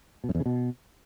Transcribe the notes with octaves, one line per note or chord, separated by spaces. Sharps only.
B2
F#2
E2
C#3
B2